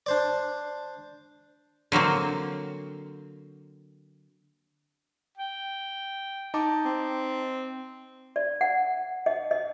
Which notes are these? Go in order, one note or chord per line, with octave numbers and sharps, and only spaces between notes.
D4 C5 D5
D3 F#3 A#3 C4
G5
D#4 A5 D6
C4
D5
F#5
D#5
D#5